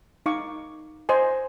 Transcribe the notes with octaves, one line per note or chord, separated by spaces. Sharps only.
D#4 F5 C#6 D6
C5 D#5 G#5